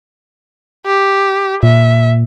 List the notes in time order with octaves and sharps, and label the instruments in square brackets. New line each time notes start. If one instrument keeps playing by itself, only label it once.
[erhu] G4
[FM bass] A#2 [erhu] E5